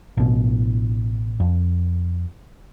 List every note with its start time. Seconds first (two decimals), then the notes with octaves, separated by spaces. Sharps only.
0.17 A1 B2
1.40 F2